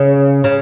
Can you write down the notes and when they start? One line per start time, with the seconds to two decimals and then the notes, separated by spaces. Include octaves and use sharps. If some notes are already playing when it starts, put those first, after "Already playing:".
Already playing: C#3
0.44 C#3